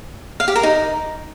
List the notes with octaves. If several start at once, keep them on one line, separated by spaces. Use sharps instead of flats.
F5
G4
A#4
D#4